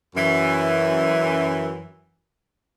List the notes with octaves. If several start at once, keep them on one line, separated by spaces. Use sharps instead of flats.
F#2 E3